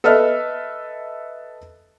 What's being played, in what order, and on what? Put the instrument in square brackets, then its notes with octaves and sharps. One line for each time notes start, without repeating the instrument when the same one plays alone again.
[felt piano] A4 B4 D#5 E5 F6